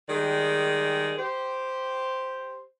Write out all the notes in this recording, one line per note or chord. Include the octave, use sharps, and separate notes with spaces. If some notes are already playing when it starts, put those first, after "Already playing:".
D#3 G3 G#3 G#4 D5
G4 C5